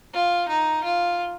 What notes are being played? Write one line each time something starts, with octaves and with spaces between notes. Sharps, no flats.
F4
D#4
F4